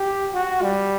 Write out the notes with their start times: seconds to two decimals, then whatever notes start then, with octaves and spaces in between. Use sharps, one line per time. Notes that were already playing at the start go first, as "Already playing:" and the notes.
Already playing: G4
0.34 F#4
0.62 G3